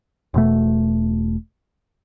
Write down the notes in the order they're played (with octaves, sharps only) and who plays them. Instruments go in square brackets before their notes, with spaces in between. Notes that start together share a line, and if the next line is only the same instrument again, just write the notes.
[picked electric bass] E1 B2 A3